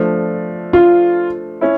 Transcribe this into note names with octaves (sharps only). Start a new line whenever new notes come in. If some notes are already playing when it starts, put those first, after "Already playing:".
Already playing: F3 A3 D4
F4
C#4 E4